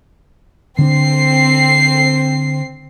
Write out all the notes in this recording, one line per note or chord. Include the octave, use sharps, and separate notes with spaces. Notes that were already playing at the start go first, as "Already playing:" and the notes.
D3 C4 D4 C7